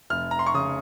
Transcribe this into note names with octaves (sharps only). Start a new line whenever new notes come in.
F1 F6
A#5
C6
C#6
C#3 D#6